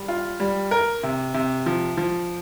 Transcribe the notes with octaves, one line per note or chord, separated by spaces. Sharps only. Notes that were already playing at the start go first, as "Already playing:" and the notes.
Already playing: G3
F4
G3
A#4
C3
C3
F3
F3